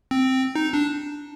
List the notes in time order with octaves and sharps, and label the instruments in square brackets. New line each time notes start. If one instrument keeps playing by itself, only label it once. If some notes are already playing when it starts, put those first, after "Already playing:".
[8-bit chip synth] C4
D#4
D4